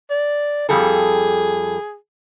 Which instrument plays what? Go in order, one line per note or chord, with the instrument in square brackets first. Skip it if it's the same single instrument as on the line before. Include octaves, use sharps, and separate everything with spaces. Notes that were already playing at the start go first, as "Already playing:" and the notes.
[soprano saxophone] D5
[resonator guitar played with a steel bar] F2 G3 A4 [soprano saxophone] G#4